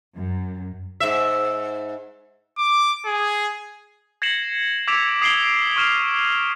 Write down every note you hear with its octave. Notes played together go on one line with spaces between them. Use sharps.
F#2
G#2 E5
D6
G#4
G#6 A#6 C7 C#7 E7 F#7
D6 E6 G#6 B6 D7 F7
D#6 C7 D7 F#7 G7
C#6 F6 E7 F7